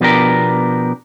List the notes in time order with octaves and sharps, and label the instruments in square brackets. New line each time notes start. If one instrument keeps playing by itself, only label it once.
[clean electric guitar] B2 F3 B3 D4 G4 A#4